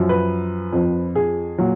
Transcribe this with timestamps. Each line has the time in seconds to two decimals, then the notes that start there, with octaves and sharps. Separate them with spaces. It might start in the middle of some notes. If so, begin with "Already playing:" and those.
Already playing: F#2 F3
0.09 B4
0.73 F2 F3
1.15 G#4
1.58 A#2 F#3